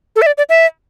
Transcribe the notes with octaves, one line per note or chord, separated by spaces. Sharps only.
A4
E5
D5
D5
E5